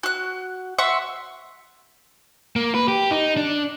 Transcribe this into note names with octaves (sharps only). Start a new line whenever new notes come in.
F#4 F#6
E5 F#5 C6 C#6
A#3
B4
G4
D#4
D4